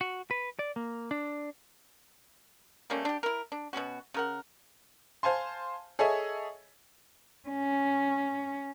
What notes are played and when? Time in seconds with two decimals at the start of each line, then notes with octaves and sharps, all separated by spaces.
0.01 F#4
0.31 B4
0.59 D5
0.76 A#3
1.11 D4
2.90 G3 A3 A#3 C#4
3.05 D4 G4
3.23 E4 A#4
3.52 D4
3.73 B2 B3 C#4 F#4
4.14 C#3 A#4 F#5
5.23 C5 F5 G#5 A5 C6
5.99 G#4 A4 C#5 D#5 E5 G#5
7.49 C#4